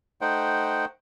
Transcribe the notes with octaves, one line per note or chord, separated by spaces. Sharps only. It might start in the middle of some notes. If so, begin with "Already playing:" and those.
A3 D#4 C5 F#5 G5